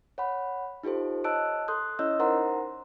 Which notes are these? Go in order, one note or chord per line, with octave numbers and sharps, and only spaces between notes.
C#5 F#5 B5
D#4 F4 G4 A4 C5
C#5 D#5 A5 E6 F#6 D7
A4 C6 D#6 F#6 G6
C#4 E4 C#5 D#5 E6 G6
D#4 A#4 C5 F#5 A#5 C6